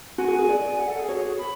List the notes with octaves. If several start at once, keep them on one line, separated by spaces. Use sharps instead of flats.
F#4 G#5
G#4
G#4
D5
F#5
A4
G#4
F#4 C#5
G#4
B5